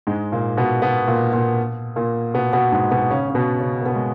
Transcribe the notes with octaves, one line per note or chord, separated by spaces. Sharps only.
G#2 G#3
A#2 A#3
B2 B3
B2 B3
A#2 A#3
A#2 A#3
A#2 A#3
B2 B3
B2 B3
G#2 G#3
B2 B3
C#3 C#4
C#4
B2 B3
C#3 C#4
A#3
B2 B3
G#3